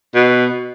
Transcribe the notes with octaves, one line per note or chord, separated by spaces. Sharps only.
B2